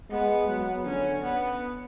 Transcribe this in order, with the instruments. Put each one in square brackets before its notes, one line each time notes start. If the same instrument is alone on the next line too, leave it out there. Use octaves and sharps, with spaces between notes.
[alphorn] G#3 [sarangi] B3
[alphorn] F#3
[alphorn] D3 [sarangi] C#4
[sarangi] B3